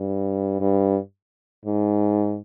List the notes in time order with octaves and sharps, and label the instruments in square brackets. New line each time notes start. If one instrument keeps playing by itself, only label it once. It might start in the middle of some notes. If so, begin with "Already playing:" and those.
Already playing: [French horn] G2
G2
G#2